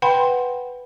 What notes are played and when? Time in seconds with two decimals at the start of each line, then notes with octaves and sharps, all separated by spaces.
0.02 B4 F#5 G5 B5 C6